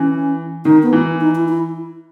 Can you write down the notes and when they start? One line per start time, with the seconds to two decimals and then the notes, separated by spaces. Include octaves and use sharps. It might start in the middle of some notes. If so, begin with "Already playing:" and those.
Already playing: E3 C#4
0.65 D#3 D#4
0.83 B3
0.93 E3
1.20 D#4
1.35 E4
1.48 E4